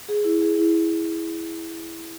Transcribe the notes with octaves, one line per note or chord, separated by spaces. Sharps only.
G#4
E4
G#4
E4